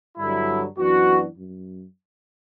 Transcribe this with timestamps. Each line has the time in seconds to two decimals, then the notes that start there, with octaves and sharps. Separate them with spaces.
0.17 G2 D3 F#3 E4
0.77 F#2 E3 B3 D4 F#4
1.37 F#2